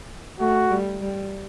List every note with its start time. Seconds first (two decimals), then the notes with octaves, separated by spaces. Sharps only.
0.40 A3 F#4
0.71 G3
1.01 G3